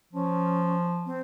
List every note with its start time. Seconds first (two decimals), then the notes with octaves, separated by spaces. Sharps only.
0.13 F3 C#4
1.06 C4